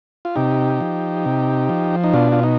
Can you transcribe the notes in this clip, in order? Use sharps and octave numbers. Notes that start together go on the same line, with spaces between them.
F4
C3 D#4 G4
F3
C3
F3
D#4
B2 D4 F4
F4
D#4